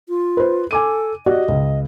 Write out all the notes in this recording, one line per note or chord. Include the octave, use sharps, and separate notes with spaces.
F4
B4 C5
A4 G#5 D6 D#7
F#4 G4 D5 D#5
C#2